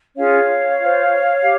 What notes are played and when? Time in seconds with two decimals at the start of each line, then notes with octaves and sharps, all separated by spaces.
0.16 C#4 F4 G#4 C#5 F5
0.79 F4 C5
1.41 G4